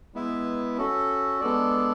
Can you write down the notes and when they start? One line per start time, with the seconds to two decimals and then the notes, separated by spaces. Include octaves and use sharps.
0.14 G#3 B3 E4 B4 E5
0.77 C#4 F#4 A4
1.41 G#3 B3 D4 A4 D5